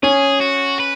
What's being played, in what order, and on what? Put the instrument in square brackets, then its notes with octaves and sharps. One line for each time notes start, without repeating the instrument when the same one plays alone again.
[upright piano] C#4 [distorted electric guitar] G#4
[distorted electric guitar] F#4
B4